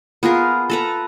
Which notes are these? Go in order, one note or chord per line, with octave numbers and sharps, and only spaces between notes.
B3 F4 G#4 A#4
A4 B4 A#5